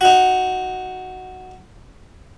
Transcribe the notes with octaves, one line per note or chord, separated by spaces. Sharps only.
D#4 F#4